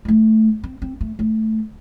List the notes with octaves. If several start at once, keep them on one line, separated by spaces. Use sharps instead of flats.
G3
A3
C4
C4
A3
A3